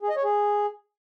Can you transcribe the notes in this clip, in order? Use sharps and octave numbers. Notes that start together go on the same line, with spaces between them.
G#4
D#5
C#5
G#4